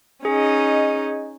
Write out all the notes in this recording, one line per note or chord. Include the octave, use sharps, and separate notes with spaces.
C#4 D#4 G#4 D#5